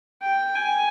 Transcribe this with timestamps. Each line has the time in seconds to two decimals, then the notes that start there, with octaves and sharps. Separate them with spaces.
0.22 G5
0.55 G#5